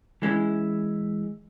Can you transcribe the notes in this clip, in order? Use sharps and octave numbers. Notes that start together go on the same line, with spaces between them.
E3 G#3 C#4 E4